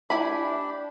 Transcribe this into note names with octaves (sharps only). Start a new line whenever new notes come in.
D4 E4 G4 G#5 B5